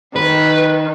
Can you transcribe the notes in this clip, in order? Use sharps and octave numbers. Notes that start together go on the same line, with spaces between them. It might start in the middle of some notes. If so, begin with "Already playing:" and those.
D#3 B4